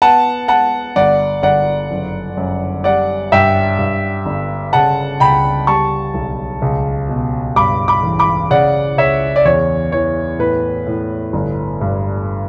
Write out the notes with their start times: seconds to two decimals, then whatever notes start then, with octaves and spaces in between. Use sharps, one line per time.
0.02 B3 F#5 A5
0.48 B3 F#5 A5
0.96 G1 D5 F#5
1.43 G1 D5 F#5
1.91 F#1
2.37 F#2
2.84 G3 D5 F#5
3.32 G2 E5 G5
3.79 G2
4.26 G1
4.73 C#3 F#5 A5
5.20 C#2 G5 B5
5.67 G3 A5 C#6
6.14 B1
6.62 C#2
7.09 B2
7.56 G2 B5 D6
7.88 B5 D6
8.03 A1
8.19 B5 D6
8.50 C#3 D5 F#5
8.97 C#2 C#5 E5
9.36 D5
9.45 E2 C#5
9.92 E3 C#5
10.39 A2 B4
10.87 A2
11.33 G1
11.81 G2